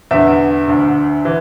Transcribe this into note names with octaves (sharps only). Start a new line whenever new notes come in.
E2 D3 E5
D2 D3
E3